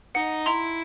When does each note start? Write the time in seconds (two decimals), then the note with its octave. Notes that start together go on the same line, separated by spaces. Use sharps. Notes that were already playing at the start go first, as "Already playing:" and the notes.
0.15 D#4 F#5
0.46 E4 A#5 C6